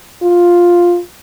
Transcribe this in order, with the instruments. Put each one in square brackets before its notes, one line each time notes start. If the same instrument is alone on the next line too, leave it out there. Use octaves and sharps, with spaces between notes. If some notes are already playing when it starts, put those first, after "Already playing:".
[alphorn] F4